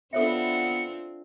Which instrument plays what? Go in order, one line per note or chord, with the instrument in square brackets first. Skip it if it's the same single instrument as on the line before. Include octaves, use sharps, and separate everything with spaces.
[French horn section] B3 [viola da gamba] C4 D4 F4 [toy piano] A4 C#5 E5 [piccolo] C#7